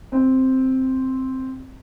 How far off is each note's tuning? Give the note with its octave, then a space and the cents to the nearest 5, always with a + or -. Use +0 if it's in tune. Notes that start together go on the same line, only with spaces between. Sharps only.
C4 +0